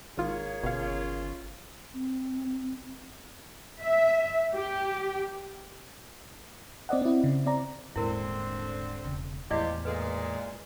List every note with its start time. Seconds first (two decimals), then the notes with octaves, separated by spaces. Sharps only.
0.18 G#1 A#3 F4 G#4 C#5
0.63 G1 B2 C#4 F4 F5
1.94 C4
3.82 E5
4.55 G4
6.89 C4 D5 D#5 F#5
7.02 C4 E4
7.24 C#3
7.46 C4 D5 A#5
7.96 D#1 G#2 D3 C4 E4 A#4
9.04 E1 C#3
9.51 E2 A2 F3 G#3 E4 G4 D5 D#5
9.85 A#2 G#3 A4 B4